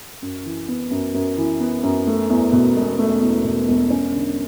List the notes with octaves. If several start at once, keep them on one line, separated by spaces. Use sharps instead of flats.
F#2
E3
B3
F#2
F#2
E3
B3
F#2
A3
E2
B2
E1
A3
E2
B2
E1
C#4
D3